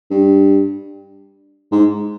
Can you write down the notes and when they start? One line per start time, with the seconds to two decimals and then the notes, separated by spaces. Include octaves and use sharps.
0.11 G2
1.72 G#2